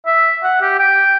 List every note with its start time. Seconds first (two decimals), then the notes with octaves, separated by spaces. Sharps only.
0.07 E5
0.44 F#5
0.61 G4
0.79 G5